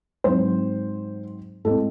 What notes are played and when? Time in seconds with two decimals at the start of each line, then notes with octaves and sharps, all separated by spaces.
0.24 G#2 F#3 C4 C5
1.65 A2 G#3 C4 A4